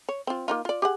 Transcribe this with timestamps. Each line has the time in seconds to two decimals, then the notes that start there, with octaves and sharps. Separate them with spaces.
0.09 C#5
0.27 C4 F4
0.48 A#3 D#4 F4
0.65 F4 D5
0.82 G4 G#4 F#5